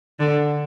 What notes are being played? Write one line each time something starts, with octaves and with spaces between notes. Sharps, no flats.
D3